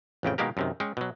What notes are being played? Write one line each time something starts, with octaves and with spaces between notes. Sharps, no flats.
A1 F2 C#3 G5
B2 D#3 G#3 A#3 G4 A#4
F#2 C3 D#3
G#3 C#4 G5
B2 F#3